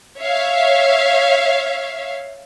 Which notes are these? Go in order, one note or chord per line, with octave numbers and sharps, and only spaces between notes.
C#5 E5 F5